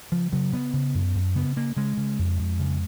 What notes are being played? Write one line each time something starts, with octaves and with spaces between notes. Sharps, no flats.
C#3 F3
C#3 F#3
C#3 B3
C#3
F#2
F#2
C#3 B3
C#3 A#3
C#3 G#3
C#3
F2
F2
C#3